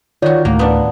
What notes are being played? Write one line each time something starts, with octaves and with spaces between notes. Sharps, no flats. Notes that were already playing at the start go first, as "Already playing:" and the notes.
D#3 F4 F#4 C#5 D5
D2 A2 A#3 A#5
B3 D4